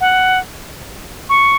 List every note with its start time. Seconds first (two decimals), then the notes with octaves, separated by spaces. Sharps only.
0.01 F#5
1.29 C#6